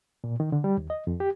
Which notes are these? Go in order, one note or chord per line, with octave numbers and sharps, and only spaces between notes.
A#2
D#3
D3
G3
D#2
D#5
F2
G4